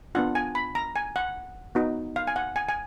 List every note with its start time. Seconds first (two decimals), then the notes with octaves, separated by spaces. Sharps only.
0.15 B3 D4 F4 F#5
0.35 G#5
0.55 B5
0.75 A#5
0.96 G#5
1.16 F#5
1.75 B3 D#4 F#4
2.16 F5
2.27 G#5
2.36 F#5
2.56 G#5
2.69 G#5